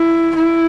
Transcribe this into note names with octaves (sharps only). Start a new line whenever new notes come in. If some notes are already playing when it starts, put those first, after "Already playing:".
Already playing: E4
E4